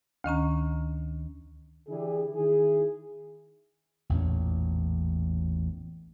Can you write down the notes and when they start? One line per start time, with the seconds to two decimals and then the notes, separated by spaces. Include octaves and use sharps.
0.24 D2 D#3 C#4 A#5
1.88 D3 E3 D4 E4 G4 G#4
2.34 D#3 E4 G#4
4.10 A1 E2 A#2 C#4